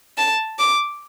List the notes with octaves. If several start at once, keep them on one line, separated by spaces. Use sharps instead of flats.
A5
D6